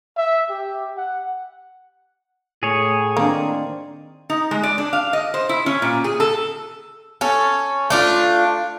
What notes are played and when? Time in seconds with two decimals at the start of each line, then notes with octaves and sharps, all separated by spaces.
0.16 E5
0.50 G4
0.97 F#5
2.63 A2 G#4 C#5
3.17 D#3 A#3 C4 D4
4.30 D#4
4.51 G#3
4.63 D5
4.78 D4
4.93 F5
5.13 D#5
5.34 C5
5.49 E4
5.66 C#4
5.82 A#2
6.04 G#4
6.20 A4
7.21 C#4 A4
7.90 A3 D4 F4